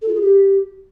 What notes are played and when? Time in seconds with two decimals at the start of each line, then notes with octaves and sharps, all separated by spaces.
0.02 A4
0.08 F4
0.15 G#4
0.22 G4